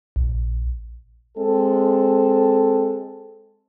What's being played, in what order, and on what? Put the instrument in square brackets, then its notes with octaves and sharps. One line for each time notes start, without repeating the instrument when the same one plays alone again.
[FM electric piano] A#1
[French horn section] G#3 C4 A4